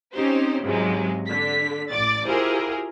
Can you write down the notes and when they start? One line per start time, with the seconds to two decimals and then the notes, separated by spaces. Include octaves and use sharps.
0.13 C4 C#4 D#4 G4 C5
0.62 C#2 G#2 C3 F#3 G#3
1.27 D3 B6
1.91 A1 D5 D6 A6
2.27 E4 F4 G4 G#4 A#4 C5